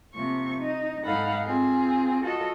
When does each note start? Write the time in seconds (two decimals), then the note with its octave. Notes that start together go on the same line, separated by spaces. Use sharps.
0.13 C3 F3 A#3 C#6
0.58 D#4
1.04 G#2 D#4 A4 F5 F#5 B5
1.44 C4 F4 G#4
2.22 F4 F#4 A4 D#5